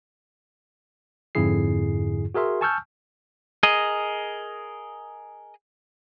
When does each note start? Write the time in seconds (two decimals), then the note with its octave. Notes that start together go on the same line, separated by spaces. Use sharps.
1.35 F2 G#2 D3 E4 G#4 C7
2.35 F#4 G#4 A#4 E5 C6
2.61 G#5 A5 C#6 E6 F6 G6
3.63 G#4 A#4 D#5